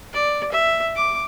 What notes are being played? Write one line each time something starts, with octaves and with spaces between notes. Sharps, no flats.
D5
E5
D6